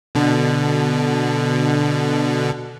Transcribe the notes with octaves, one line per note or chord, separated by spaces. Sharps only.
B2 D3